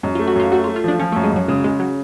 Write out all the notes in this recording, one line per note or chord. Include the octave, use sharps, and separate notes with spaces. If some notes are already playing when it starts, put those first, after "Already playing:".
F#2 G#3
F4
A3
F#4
F#2 F4
A3 F#4
F4
A3
F4
F3 D4
F3 C#4
A3
F#2
G#3
F#2 F#3
C#3 G#3
C#3 G#3
F#3